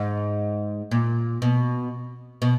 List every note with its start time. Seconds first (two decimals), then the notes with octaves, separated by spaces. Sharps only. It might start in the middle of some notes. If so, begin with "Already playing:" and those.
Already playing: G#2
0.91 A#2
1.42 B2
2.42 B2